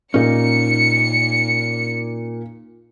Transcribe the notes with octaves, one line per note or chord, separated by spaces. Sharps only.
A#2 A#3 C#4 D#4 C#7